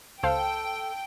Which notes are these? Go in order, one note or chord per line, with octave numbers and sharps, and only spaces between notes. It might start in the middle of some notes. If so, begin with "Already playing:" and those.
C#2 A4 C5 F5 G5